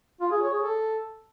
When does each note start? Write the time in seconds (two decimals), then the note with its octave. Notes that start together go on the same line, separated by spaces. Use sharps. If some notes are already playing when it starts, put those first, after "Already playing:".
0.21 F4
0.31 G#4
0.42 C#5
0.53 G#4
0.63 A4